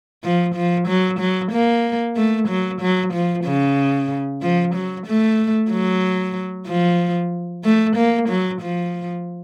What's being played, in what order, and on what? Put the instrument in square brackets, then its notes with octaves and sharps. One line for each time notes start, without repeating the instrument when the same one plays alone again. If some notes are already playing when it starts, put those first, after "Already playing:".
[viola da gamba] F3
F3
F#3
F#3
A#3
A3
F#3
F#3
F3
C#3
F3
F#3
A3
F#3
F3
A3
A#3
F#3
F3